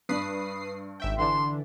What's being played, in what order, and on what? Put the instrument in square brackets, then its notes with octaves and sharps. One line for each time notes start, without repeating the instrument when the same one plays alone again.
[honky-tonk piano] G2 D4 [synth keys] B4 D#6 C7
[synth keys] G#1 E5 G5
[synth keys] D3 E3 D4 [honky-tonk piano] E5 [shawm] C6